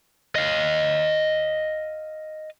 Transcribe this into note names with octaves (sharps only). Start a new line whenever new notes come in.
D#5 F5